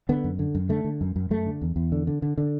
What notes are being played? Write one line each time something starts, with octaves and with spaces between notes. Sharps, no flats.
D3 B3
F#2
D3
F#2
D3 A3
D3
F#2
F#2
F#2 A3
D3
E2
E2
D3
D3
D3
D3